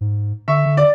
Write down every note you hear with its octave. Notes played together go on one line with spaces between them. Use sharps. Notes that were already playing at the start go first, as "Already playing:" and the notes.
G#2
D3 E5 C#6
D3
D5